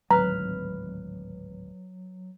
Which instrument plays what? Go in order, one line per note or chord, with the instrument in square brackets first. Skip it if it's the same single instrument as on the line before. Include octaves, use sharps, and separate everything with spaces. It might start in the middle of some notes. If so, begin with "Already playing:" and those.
[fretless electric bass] D1 G#1 [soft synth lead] F#3 [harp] B4 F6 [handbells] A#5